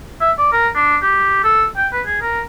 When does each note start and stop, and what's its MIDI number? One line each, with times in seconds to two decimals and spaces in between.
0.21 0.32 76
0.39 0.52 74
0.53 0.69 70
0.75 0.97 62
1.02 1.44 67
1.44 1.66 69
1.77 1.88 79
1.93 2.02 71
2.06 2.19 68
2.22 2.42 70